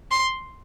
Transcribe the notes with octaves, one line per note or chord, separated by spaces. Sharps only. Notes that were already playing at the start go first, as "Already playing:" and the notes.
C6